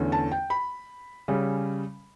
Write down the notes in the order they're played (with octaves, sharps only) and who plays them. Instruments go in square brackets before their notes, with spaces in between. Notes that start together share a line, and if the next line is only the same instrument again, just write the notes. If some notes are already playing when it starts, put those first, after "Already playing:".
Already playing: [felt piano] E2 D3 A3 C#4
A5
G5
B5
C#3 G3 C#4